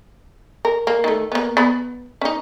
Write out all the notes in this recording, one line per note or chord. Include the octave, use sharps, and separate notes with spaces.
A#4
A#3
D#3 A3
A#3 B3
B3 B5
C#4 D#4